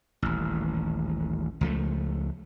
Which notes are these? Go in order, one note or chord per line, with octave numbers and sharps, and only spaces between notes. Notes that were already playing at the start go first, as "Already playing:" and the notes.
D#1 A1
C#2 F3 A3